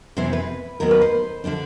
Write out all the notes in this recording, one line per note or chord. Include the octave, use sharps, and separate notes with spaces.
F2 C3 E3 G#3 B3 C5
B4
D#2 D#3 F#3 B3 A#4
B4
C5
D3 F3 A3 D4